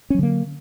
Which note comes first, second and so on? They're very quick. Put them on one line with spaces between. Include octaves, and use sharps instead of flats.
C#4 F#3 D3 A#3